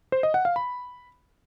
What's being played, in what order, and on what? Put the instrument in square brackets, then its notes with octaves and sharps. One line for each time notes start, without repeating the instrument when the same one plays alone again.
[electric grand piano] C5
D#5
F#5
F5
B5